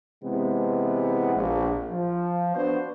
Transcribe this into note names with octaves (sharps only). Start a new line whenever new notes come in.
C3 E3 G#3 B3
A#1
F3
B3 D4 F#4 B4 C5